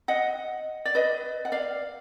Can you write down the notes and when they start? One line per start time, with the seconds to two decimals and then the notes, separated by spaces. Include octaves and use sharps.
0.08 D#5 F#5
0.85 D5
0.95 B4 D#5
1.45 F#5
1.52 D5 F5